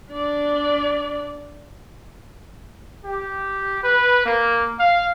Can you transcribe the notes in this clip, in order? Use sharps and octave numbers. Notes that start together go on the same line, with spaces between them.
D4 D5
G4
B4
A#3
F5